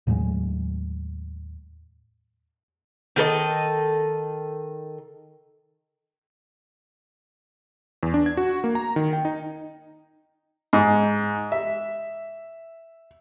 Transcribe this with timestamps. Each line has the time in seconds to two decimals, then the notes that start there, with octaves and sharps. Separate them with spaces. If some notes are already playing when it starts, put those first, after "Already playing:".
0.07 D#2 A2 F#3 G#3
3.16 D#3 A4 A#4 D#5
8.03 E2
8.14 D4
8.26 G#6
8.37 F#4
8.64 A#3
8.75 A#5
8.96 D#3
9.13 G5
9.25 D#4
10.73 G#2
11.52 E5